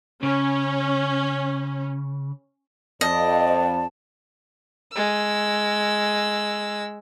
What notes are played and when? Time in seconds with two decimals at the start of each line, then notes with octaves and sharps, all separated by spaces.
0.23 C#3 C#4
3.01 F2 D5 D#5 A5
4.92 G#3 E6